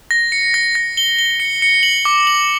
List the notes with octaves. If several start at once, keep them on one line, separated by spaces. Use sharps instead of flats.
A#6
C#7
A#6
A#6
G7
G7
C#7
C#7
F#7
D6
F#7